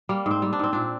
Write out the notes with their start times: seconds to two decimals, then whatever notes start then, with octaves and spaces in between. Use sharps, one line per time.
0.09 G3 A#3
0.26 G#2 C4
0.42 G3
0.53 D4
0.59 G#2 C4
0.73 A#2 D4